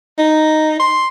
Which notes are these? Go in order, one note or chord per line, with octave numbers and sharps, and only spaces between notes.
D#4
C6